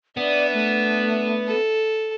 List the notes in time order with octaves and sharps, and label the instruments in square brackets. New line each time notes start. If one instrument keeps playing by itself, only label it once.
[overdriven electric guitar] B3 [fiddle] D4 E5 [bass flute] D5
[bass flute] A3
[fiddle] A4